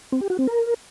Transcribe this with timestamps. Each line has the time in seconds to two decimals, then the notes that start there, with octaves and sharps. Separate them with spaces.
0.12 C4
0.21 G4
0.30 F#4
0.39 C4
0.47 A#4